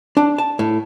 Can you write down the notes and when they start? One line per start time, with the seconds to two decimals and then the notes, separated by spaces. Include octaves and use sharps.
0.17 D4
0.38 A5
0.59 A2